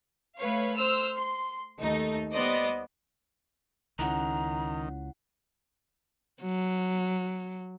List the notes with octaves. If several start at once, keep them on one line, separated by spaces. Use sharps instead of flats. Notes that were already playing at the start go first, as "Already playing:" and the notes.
A3 B4 C#5 F5
C5 E6 F6
C6
D#2 A3 D#4
G3 B3 C5 D5 D#5
C#2 D#3 C#4 E4 F#5 A#5
F#3